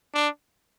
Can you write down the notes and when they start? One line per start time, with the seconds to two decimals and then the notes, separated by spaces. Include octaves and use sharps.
0.15 D4